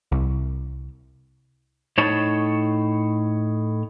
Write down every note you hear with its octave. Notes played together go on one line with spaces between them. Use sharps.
C2
A2 D#4 C#5 A5